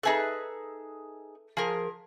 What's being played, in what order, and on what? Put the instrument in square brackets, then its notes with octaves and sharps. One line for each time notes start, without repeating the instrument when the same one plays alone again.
[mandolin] D#4 G#4 F#6 [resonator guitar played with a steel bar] A4 B4 E5
[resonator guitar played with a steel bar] F3 [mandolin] G#4 A#4